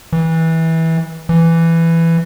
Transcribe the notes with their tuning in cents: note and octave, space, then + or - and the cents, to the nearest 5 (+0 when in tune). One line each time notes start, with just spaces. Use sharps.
E3 -20
E3 +10